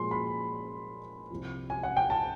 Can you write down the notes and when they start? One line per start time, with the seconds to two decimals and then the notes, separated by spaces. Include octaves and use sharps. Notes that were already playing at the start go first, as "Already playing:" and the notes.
Already playing: A#2 F3 G#3 C6
0.11 B5
1.30 C2 C3 F3
1.70 G#5
1.83 F#5
1.97 G5
2.10 A5